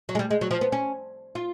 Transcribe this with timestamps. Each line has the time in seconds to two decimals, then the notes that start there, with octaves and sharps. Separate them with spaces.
0.09 F#3
0.15 G#3
0.19 G3
0.31 G#3
0.41 F#3
0.51 F3
0.61 B3
0.72 C#4
1.35 F4